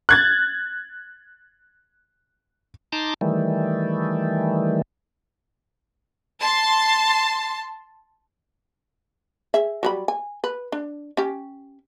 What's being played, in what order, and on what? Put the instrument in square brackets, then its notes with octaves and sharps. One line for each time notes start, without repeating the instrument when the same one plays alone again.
[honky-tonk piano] F#6 G#6 A6
[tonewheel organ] D#4 A5 A#5 C6 D6
D#3 E3 G3 A3
[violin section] A5 C6
[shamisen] G#4 E5
F#3 G3 B5
G#5
B4
D4
C#4 G4